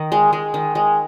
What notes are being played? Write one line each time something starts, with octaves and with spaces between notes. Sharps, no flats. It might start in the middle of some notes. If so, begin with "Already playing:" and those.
Already playing: D#3
G#3
G#3
D#3
G#3